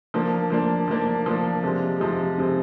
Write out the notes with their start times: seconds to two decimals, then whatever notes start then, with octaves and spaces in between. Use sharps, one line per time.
0.14 F3 A#3 D4
0.50 F3 A#3 D4
0.88 F3 A#3 D4
1.26 F3 A#3 D4
1.63 C3 F3 G#3
2.00 C3 F3 G#3
2.38 C3 F3 G#3